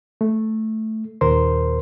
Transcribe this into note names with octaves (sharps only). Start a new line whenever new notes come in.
A3
D#2 A#2 A#4 C5 C6